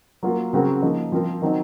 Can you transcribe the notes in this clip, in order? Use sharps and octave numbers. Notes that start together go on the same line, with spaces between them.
F#3 A#3 F4 A#4
C#3 F#3 C4 F#4 A#4
F3 A#3 D#4 A#4
F3 C4 F4 A#4
D#3 F#3 C4 D#4